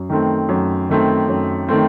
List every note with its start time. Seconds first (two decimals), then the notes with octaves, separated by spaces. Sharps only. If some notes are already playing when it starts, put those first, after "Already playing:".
Already playing: F#2
0.09 D#3 A3 C4
0.49 F#2
0.90 D#3 A3 C4
1.28 F#2
1.68 D#3 A3 C4